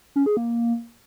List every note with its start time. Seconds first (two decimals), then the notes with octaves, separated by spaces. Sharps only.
0.16 C#4
0.26 G#4
0.37 A#3